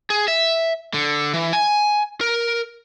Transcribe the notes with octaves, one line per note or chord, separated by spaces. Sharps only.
G#4
E5
D3
E3
G#5
A#4